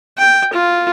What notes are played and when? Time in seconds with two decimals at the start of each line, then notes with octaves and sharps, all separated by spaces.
0.18 G5
0.53 F4